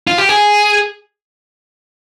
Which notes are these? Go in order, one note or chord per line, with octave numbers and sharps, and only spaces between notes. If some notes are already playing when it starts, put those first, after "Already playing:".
F4
G4
G#4